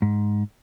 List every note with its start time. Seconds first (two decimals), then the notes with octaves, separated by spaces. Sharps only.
0.02 G#2